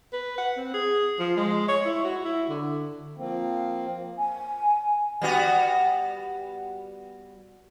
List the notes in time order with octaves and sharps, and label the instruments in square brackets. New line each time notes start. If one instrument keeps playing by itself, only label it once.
[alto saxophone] B4
F#5
C4
G#4
F3
G#3
C#5
E4
F#4
E4
D3
[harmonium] F3 A#3 C4
[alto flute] G#5
[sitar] G3 B3 F#4